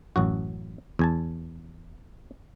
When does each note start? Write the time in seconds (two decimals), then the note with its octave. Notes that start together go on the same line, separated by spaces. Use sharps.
0.16 A1 F#2 F#4
0.99 E2 G#5 A5